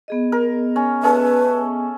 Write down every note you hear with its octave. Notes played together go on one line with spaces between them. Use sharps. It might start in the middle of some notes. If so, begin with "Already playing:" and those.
B3 G#4 D#5
A#4
C#4
A3 C#4 A4 B4